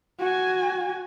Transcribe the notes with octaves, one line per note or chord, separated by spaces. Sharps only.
F#4 G#5